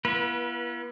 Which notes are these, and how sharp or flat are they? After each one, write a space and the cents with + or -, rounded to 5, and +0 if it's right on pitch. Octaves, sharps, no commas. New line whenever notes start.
B3 -40 E4 +45 B4 -25